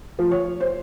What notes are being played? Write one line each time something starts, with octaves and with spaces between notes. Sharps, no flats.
F3
C#5
C5